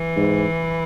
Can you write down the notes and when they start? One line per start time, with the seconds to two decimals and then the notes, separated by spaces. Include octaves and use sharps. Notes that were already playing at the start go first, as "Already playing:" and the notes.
Already playing: E3
0.17 G#2